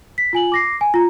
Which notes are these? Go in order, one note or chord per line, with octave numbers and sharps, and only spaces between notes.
B6
F4 G#5 F#7
D6 A#6 C7
G#5
F4 A#5